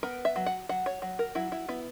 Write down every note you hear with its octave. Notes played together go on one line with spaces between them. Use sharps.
B3 A#4
E5
F#3
F#5
F#3 F#5
C#5
F#3
A#4
F#3 E4
E4
B3 E4